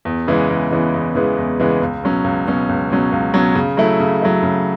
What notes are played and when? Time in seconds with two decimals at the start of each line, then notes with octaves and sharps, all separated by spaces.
0.05 E2
0.28 C#3 E3 G#3 B3
0.50 E2
0.71 C#3 E3 G#3 B3
0.94 E2
1.15 C#3 E3 G#3 B3
1.38 E2
1.60 C#3 E3 G#3 B3
1.81 C#2
2.03 B2 F#3 C#4
2.24 C#2
2.46 B2 F#3 C#4
2.69 C#2
2.90 B2 F#3 C#4
3.12 C#2
3.34 B2 F#3 C#4
3.55 C#3
3.77 F#3 A3 E4
4.00 C#3
4.22 F#3 A3 E4
4.43 C#3